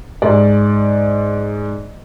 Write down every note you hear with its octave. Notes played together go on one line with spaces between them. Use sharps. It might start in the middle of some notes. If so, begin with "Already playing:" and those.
G#2 D5